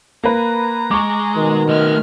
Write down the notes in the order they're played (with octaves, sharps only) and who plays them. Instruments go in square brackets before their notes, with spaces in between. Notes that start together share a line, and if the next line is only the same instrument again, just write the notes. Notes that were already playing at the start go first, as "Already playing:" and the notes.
[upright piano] A#3 B4 [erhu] A#5
[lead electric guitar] G#3 [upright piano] C#6 D6
[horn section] B2 D#3
[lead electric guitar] A3 D#5 [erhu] F6